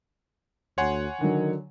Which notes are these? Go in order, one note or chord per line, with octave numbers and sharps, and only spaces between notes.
D2 C#5 F#5 G#5 C6
D3 D#3 F#3